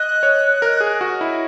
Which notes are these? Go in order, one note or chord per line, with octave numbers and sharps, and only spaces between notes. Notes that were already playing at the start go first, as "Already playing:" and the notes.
Already playing: D#5 F#6
C#5
A#4
G#4
F#4
E4